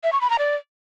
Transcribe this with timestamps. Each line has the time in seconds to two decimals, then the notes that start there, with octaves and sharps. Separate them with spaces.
0.04 E5
0.12 C#6
0.21 B5
0.30 A#5
0.39 D5